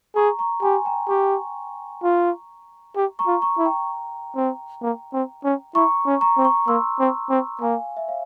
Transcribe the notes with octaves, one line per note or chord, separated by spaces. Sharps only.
G#4 A#5 C#6
A#5 C#6
G4 G#5 C6
G5 A#5
G4 A#5 C#6
F4
G4
A#5 C#6
F4
A#5 C#6
E4
G5 A#5
C4
A#3
C4
C#4
E4 A#5 C#6
C#4
A#5 C#6
C4
A#5 C#6
A#3 C6 E6
C4
C4
A#3 F5 G#5
E5
C#5 F5